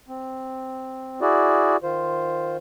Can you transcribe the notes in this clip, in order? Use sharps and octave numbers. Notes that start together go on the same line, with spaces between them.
C4
E4 F#4 G#4 D5
D#3 F4 C5